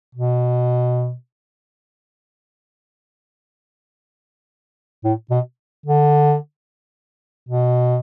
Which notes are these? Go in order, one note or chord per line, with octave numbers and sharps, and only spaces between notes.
B2
A2
B2
D3
B2